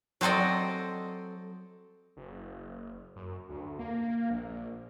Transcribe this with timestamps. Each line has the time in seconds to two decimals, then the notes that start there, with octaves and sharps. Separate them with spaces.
0.21 F#3 C4 A4 D5 D#5
2.16 F#1
3.16 F#2
3.49 D2
3.79 A#3
4.30 A#1